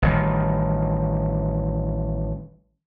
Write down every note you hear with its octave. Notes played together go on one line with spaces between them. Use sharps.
A1 D#3 G3